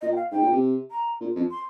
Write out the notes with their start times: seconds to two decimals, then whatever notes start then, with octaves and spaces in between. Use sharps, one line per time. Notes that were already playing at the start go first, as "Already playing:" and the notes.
0.01 A#2 D#5
0.12 G5
0.16 F5
0.31 G#2 G5
0.41 A#2
0.52 C3
0.91 A#5
1.21 A#2
1.36 F2
1.51 C6